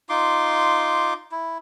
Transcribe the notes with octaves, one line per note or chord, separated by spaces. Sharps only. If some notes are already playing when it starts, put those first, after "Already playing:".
D#4 F4 C6 D6
E4